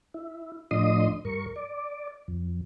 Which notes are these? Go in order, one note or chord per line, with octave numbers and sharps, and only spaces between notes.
E4
A2 F3 D4 D#5 C6 D#6
G2 A#4 C#6
D5
F2